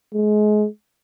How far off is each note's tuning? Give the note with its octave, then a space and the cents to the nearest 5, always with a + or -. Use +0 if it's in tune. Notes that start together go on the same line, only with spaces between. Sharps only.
G#3 +25